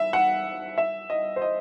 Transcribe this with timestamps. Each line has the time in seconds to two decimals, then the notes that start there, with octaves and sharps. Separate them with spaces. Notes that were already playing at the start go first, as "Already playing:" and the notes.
Already playing: E5
0.13 F#5
0.78 E5
1.10 D#5
1.36 C5
1.42 D#5